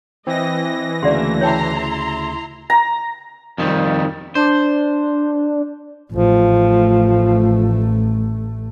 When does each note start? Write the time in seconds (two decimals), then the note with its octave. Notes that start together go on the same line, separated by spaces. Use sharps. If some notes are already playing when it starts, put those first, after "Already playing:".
0.27 E3 C4 D#5 A#6
1.03 D2 C#3 A3 A#3 D5 F#5 C6
1.41 E4 C#5 G5 A5 A#5 C6
2.70 A#5
3.58 F2 D#3 G3
4.35 D4 C5
6.12 A1 F3 A3